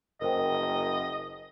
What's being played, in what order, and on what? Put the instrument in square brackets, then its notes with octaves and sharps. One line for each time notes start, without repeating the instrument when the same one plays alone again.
[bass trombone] F#1 [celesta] A#4 C5 G5 [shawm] D#5